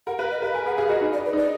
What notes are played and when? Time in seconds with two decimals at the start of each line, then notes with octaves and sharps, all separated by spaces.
0.07 A#4 F#5
0.18 B4 F5
0.31 D#5
0.42 B4 F5
0.54 A#4 G#5
0.66 G#4 F#5
0.77 G#4 F5
0.89 F#4 D#5
1.01 D#4
1.13 D5
1.18 D4
1.26 B4
1.33 D#4 D5